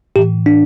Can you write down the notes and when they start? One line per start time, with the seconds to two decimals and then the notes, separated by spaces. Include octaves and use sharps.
0.16 A2 E3 G4
0.46 D4